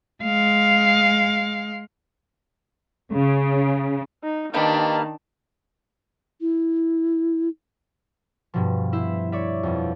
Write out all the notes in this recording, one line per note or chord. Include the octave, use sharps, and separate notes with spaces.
G#3 F5
C#3
D#4
D#3 A#3 D4 D#4 G4 B4 A5 F6
E4
G2 B2 F3
E4 C5 E5
C#5 D5 E5
F2 B2